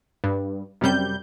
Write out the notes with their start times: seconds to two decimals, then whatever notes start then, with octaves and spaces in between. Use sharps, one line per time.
0.24 G2
0.81 F#2 C3 G3 G6